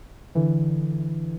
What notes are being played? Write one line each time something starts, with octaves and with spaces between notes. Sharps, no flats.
D3 E3